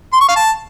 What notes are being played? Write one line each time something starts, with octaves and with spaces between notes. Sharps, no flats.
C6
C#6
F5
A5